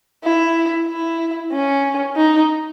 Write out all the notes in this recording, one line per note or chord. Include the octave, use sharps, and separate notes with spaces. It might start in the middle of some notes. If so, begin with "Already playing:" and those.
E4
E4
C#4
D#4